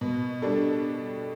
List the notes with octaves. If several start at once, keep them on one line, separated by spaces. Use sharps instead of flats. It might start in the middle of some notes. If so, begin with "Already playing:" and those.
B2
G3 D4 A4